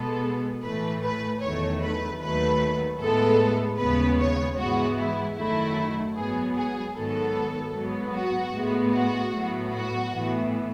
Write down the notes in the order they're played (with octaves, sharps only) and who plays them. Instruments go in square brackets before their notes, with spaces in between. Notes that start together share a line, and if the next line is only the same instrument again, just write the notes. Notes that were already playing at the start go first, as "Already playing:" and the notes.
Already playing: [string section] B2 G#3 B3 A4
A2 E3 A3 B4
B4
E2 D#3 F#3 A3 C#5
B4
D#2 D#3 F#3 A3 B4
A2 G#3 B3 A4
D#2 C#3 G#3 B3 B4
C#5
G#2 E3 G#3 B3 F#4
E4
F#2 D#3 F#3 A3 E4
G#2 F#3 B3 G#4
G#4
G#2 D#3 F#3 B3 A4
G#2 F#3 B3
F#4
A2 G#3 B3
F#4
A2 F#3 B3
F#4
A2 E3 B3